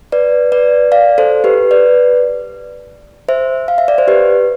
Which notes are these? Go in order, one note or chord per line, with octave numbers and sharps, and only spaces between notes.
B4 D5
B4 D5
D5 F5
A4 C5
G4 B4
B4 D5
C5 E5
F5
E5
D5
C5
G4 B4